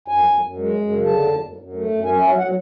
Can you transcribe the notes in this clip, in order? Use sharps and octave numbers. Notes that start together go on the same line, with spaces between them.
F#2 G#5
F#2
F#2
G#3
F#2
C#3
D3 A5
F#2
F#2
F#2
A3
F#2
C#4 G#5
F#3 E5
F#3 F#5